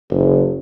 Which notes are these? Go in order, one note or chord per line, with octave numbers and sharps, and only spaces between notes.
F#1